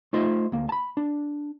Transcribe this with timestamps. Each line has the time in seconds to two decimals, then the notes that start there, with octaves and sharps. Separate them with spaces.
0.13 A3 D#4 F4 C5 D#5 E5
0.52 D2 A#3
0.69 A5 B5
0.97 D4